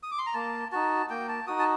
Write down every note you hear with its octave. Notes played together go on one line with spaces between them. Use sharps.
D#6
D6
C6
A#5
A#3 A5
D#4 F#4 A5
A#3 G5
A5
D#4 F#4 D#6
A5